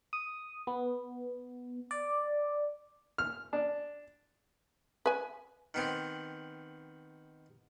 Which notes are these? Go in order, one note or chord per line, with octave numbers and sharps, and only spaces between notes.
D#6
B3
D5
F6
D4
B4 G#5
D#3 B3 C4